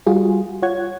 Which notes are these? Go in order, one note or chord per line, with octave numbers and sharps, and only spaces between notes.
G3 F4 F#4 G#4
F4 C#5 F#5 G#6